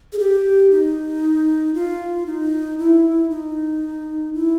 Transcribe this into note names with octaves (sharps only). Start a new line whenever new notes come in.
G#4
G4
D#4
F4
D#4
E4
D#4
E4